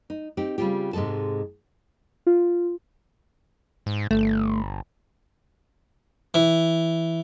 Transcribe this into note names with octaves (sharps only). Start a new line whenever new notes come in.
D#4
C4 D#4 G4
C#3 G3 C4 F4 G4
G#2 C3 G#3 A4 A5
F4
G#2
G1 A3
E3